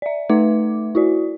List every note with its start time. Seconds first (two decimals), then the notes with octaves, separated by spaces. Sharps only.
0.02 D5 E5
0.29 A3 D#4 B4 E5 D6
0.95 E4 F#4 D5